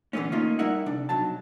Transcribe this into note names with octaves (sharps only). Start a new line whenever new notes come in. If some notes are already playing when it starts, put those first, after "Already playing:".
D3 E3 F3 A3 B3 C#4
A3 A#3 C#4 D#4 F4
G3 D#4 E4 A#4 E5 F#5
C3 D4
B1 F#3 A5